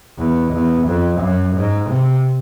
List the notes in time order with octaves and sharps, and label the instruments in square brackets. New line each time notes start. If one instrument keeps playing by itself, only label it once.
[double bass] E2
E2
F2
F#2
G#2
C3